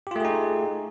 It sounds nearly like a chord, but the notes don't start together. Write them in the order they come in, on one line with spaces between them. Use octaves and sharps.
G4 F4 A3 G#4 D#4